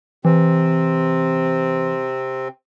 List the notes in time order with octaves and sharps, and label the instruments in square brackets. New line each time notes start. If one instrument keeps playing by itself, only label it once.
[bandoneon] C3 C4 [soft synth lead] E3